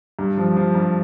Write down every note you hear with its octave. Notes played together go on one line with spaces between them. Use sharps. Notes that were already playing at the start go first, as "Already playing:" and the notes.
G2
F3
F3
G2